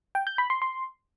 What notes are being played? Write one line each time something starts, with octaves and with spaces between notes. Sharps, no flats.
G5
G6
B5
C6
C6